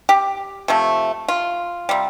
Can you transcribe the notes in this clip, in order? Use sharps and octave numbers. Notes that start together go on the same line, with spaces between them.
G4
C3 F3 A3
F4
C3 G3